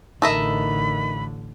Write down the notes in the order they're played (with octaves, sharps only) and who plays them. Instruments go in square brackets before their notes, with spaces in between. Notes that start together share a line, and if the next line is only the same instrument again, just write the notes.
[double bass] A1 D3 [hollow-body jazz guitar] D#4 A#4 [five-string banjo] A4 D#5 E5 [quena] B5